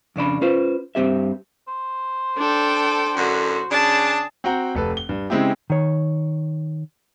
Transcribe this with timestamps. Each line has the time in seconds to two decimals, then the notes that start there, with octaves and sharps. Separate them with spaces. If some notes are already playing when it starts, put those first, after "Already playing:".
0.16 F2 C#3 D4 B5
0.41 C#4 F4 B4 C5
0.95 G2 C4 G4 E5
1.68 C5
2.37 D4 A4 G5
3.17 F#2 A2 D3 F#4
3.71 C#3 D4 G#4 A5
4.44 C4 F#4 F#5 G5 A#5
4.75 F1 A4 B4
4.97 G7
5.09 G2
5.30 C#3 G#3 C4 E4 G4
5.70 D#3 C#5